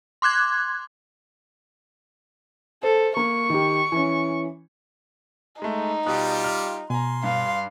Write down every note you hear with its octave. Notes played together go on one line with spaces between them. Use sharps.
C6 D6 F#6 G#6
A4 C5
A#3 C#6
D#3 G4
E3 C#4
G#3 A3 D#4
B2 G3 F4 G4 D#6 F#6
F6
B2 G#5 A#5 C6
G2 F5